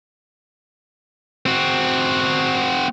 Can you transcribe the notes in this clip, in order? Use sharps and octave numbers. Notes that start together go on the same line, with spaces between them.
C4 F#4